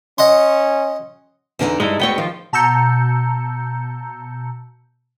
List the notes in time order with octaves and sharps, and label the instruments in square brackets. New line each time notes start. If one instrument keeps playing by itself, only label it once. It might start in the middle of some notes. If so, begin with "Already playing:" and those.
[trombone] C#4 [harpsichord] D#5 F#5 C6
[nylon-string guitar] E2 D3 D#4
[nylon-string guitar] G2 [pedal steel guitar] G#3 D#4 E4
[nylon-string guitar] D2 G#3 C#5 [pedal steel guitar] B3 G5
[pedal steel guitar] D#3 D#4 F4 [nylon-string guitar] F3
[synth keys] B2 A5 A#5 E6 G6 C#7